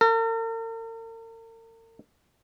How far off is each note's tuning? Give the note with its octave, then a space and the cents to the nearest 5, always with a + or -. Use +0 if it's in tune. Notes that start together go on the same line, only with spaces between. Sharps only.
A#4 -45